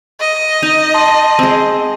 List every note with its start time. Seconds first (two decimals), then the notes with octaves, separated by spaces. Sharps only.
0.20 D#5
0.63 D#4
0.94 A5 C6
1.39 G#3 C4